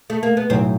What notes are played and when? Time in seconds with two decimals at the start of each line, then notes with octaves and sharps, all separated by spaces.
0.10 A3
0.23 A#3
0.37 B3
0.50 B1 A2 F#3 C4